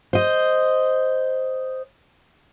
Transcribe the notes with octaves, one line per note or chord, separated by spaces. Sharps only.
C5 D#5